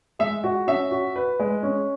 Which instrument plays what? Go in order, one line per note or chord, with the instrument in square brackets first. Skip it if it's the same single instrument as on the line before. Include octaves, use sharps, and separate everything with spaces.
[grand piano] G#3 [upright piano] E5
[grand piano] F#4
[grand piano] C#4 [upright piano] E5
[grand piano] F#4
B4
G#3
C#4